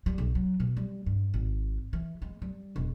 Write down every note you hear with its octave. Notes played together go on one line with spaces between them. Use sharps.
G3
B1
F#3
B2
G3
G2
G#1
E3
G#3
G3
E1